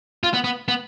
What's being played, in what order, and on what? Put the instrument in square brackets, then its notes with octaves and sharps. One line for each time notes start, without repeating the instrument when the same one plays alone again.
[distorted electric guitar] F4
B3
B3
B3